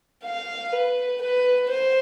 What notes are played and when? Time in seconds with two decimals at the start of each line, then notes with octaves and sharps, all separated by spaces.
0.24 F5
0.73 B4
1.22 B4
1.69 C5